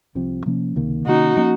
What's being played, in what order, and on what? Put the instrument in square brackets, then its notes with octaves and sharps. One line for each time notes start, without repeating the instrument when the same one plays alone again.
[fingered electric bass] C2 C3 F3 C4
C3 F3 A#3 C#4
C#2 C3 D#3 A#3
[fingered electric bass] C3 D#3 A#3 C#4 [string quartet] D#4 F#4
[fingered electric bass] F3 A#3 C#4